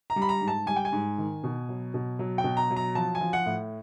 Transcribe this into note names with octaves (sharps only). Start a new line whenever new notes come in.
A#5
G3
B5
A#5
G#2
A5
G3 G#5
G5
G#5
G#2
D#3
B2
F#3
B2
F#3
G5
B2
A#5
F#3
A#5
F3 A5
G#5
F3
F#5
A2